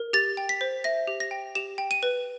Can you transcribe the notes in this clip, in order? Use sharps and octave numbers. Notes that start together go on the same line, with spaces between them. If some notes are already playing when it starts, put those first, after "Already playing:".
Already playing: A#4
G4 A6
G5
B6
C5
E5 A#6
G4
A#6
G5
G4 E7
G5
D#7
B4